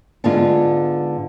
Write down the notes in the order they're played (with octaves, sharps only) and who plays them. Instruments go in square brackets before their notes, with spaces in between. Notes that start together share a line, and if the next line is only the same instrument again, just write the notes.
[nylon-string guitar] G#2 D3 G#3 B3 D4 F4